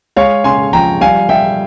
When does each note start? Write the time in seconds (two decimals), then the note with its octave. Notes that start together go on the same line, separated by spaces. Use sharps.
0.17 G#3 C#5 F5
0.44 C#3 G#5 C6
0.73 F3 G5 A#5
1.01 G3 F5 G#5
1.29 G3 E5 G5